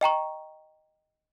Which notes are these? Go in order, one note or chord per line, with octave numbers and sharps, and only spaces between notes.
D#5 G5 A#5 C#6